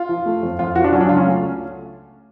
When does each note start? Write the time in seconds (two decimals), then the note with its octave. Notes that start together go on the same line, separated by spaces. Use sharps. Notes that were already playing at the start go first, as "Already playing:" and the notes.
Already playing: F4
0.09 F3
0.26 A3
0.43 F2
0.59 F2 F4
0.76 F3 F#4
0.84 D4
0.93 F#3 C#4
1.01 D4
1.09 C#2 F4
1.17 C#4
1.26 A3